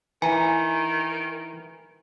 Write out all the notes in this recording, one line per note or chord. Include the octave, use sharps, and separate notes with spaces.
D#3 E3 G#5 A#5